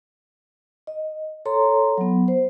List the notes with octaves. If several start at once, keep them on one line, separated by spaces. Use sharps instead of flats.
D#5
A4 C#5 A#5 C6
F#3 B3
C5